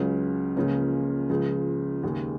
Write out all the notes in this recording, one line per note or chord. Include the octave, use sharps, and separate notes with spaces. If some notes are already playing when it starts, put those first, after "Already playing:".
Already playing: C#2 C#3 F#3 C#4
C#2 C#3 F3 A#3 C#4
C#2 C#3 F3
D#2 C#3 G#3